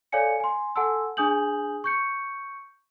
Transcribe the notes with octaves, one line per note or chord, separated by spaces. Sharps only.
A4 C#5 D5 F5 G#5 C#7
G#5 C6
A4 F#5 G#5 A5 C6 E6
D4 G#4 G#5 D#6 G6 F#7
C#6 G6 C#7